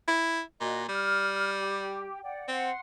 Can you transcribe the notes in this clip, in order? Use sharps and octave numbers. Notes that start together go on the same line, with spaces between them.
E4
A#2 F#4 D#5
G3 F6
G4
D5 F#5 G5
C4 F#5 C6